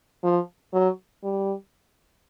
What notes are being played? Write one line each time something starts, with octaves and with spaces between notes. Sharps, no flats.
F3
F#3
G3